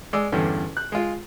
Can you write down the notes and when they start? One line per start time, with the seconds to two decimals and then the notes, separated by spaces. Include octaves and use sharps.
0.13 G#3 D5 D6 E6
0.32 E2 G2 D3 C#4
0.77 F#6
0.92 G#3 F4